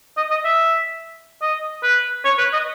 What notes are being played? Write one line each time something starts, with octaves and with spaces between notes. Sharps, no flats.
D#5
D#5
E5
D#5
B4
C#5
B4
D#5